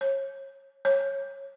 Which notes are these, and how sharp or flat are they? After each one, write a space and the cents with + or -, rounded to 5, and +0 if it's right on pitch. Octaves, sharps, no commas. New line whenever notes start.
C#5 -30
C#5 -15